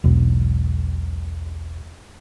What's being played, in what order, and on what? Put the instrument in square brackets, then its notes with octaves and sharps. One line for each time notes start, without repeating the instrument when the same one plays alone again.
[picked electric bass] E1 B1